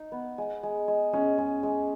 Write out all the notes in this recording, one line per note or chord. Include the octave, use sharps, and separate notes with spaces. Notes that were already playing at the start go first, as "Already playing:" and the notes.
Already playing: D#4
B3
G#3
G#3
G#3
G#3 C#4
G#3
G#3